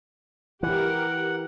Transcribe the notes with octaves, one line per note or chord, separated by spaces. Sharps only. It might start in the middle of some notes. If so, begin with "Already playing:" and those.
E3 G4 A#4 F#5